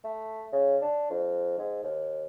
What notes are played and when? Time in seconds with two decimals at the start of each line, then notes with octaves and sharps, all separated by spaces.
0.04 A3
0.52 C#3
0.82 D4
1.10 F2
1.58 G#2
1.83 D#2